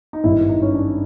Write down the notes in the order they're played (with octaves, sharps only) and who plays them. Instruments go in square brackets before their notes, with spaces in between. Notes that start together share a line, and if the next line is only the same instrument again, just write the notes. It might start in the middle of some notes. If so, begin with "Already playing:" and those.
[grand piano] D#4
G#1 G2 D#3 E4
D#4
C#4
D4